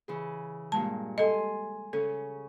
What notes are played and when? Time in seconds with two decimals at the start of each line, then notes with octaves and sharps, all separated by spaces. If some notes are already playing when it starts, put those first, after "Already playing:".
0.08 C#3 E3 G#4
0.72 G2 A#2 G#3 A5
1.18 A4 D#5 G#5 A5 C6
1.93 C#3 C#4 A4